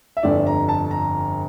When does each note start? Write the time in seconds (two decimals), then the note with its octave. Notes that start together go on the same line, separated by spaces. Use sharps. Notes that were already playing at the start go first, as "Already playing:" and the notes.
0.17 E5
0.23 G1 F2 D3 D5
0.47 A#5
0.69 A5
0.91 A#5